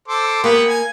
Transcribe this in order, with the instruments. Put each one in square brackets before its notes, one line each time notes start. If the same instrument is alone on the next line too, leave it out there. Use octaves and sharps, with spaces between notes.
[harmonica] A4 C5 D6
[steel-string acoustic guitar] A#3 [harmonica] B3 G4 B4
[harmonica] G#5